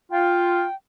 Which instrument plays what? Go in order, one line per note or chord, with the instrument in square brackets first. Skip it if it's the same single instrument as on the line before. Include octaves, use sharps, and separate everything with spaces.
[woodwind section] F4 [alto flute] G5